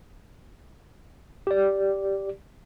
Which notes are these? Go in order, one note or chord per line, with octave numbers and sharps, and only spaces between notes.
G4 D5